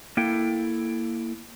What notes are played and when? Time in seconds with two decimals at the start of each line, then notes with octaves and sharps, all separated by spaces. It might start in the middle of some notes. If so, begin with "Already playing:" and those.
0.17 A#3 E4 A4 G5